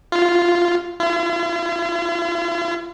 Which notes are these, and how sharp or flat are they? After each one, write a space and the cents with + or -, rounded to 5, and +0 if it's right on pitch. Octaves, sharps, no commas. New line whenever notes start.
F4 -5
F4 -45